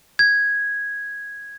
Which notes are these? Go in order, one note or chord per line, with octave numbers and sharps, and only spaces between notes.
G#6